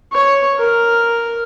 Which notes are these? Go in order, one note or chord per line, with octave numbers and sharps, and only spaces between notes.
C#5
A#4